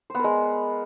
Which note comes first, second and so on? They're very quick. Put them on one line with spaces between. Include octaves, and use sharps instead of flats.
C5 B3 A#4 G#3